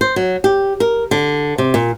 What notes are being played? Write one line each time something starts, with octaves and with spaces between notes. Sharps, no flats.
C5
F#3
G4
A#4
D3
C3
A#2